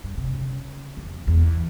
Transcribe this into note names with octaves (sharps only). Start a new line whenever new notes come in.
G2
C3
C#3
F2
E2